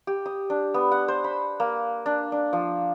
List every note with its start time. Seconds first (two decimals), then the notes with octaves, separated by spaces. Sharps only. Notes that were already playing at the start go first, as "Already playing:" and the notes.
0.07 G4
0.26 D#6
0.50 D4
0.74 B3
0.92 F#5
1.08 C5
1.24 B5
1.60 A#3
2.06 D4
2.32 D4
2.53 F3